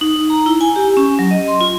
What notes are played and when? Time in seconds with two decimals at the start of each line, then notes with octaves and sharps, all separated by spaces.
0.01 D#4
0.30 A#5
0.46 E4
0.61 G#5
0.76 G4
0.97 C#4
1.19 F#3
1.31 D#5
1.48 C6
1.61 F4